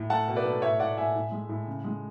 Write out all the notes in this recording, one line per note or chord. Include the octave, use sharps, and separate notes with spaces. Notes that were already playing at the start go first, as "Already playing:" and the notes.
Already playing: A2
A3 F#5 A5
B2
B4 D5
A3
A2 C#5 E5
A2 D5 F#5
A2 E5 G#5
A2
G#3
A2
C#3
G#3